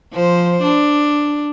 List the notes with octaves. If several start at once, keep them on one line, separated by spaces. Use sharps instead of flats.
F3 C5
D4